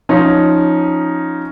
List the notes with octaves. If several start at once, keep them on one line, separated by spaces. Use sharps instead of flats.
F3 C#4 D#4